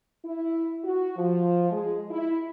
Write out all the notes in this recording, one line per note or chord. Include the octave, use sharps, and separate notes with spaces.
E4
F#4
F3
G#3
E4